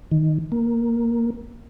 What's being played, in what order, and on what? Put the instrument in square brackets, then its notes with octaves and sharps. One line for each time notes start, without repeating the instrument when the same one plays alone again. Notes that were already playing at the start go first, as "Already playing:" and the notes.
[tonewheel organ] D#3
A#3